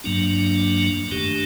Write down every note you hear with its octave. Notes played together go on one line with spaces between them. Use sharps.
G2 F#3 A#3 D4
F#2 D#3 A3 D4 G4